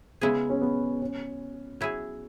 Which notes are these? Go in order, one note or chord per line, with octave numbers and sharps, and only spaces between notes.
C#3 G#3 B3 E4 G#4
C#4
B3
C#4
F#3 E4 G#4